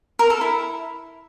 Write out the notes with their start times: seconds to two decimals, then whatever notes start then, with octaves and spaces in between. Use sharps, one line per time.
0.19 A#4
0.30 A4
0.41 E4